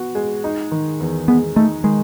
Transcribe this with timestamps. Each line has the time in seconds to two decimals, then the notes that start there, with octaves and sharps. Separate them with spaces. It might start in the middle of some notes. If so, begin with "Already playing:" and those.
Already playing: B3 F#4
0.15 G#3
0.44 D#4
0.71 D#3
1.00 E2
1.28 G#3 B3
1.56 A3 D#4
1.84 D#3 G#3